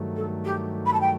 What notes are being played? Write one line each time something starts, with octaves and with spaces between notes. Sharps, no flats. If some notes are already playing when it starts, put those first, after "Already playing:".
Already playing: G2 D#3 F#3 A3
A4
G4
B5
A5
G5